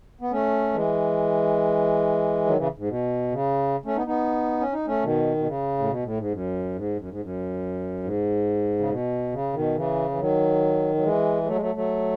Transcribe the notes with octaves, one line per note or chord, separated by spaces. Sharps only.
B3
A3 C#4
E3 G#3
D#3 F#3
C#3 E3
G#2
B2
C#3
A3 C#4
B3 D#4
B3 D#4
C#4
D#4
A3 C#4
B2 D#3
B2
C#3
A2
B2
A2
G#2
F#2
G#2
F#2
G#2
F#2
G#2
C#3
B2
C#3
B2 D#3
C#3 E3
E3
D#3 F#3
F#3
E3 G#3
G#3
F#3 A3
G#3
F#3 A3
F#3 A3